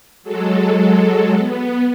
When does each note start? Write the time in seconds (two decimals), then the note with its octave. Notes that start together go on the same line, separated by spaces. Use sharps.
0.23 F#3 G#3 A4
1.37 B3